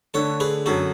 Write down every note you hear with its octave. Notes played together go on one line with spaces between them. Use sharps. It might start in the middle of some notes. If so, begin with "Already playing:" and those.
D3 A3 D4 A4 C#5
G#4 B4
F#2 D3 F#3 F#4 A4